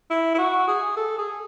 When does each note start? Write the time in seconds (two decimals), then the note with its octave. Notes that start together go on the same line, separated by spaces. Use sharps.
0.10 E4
0.34 E4
0.38 F#4
0.67 G#4
0.96 A4
1.18 G#4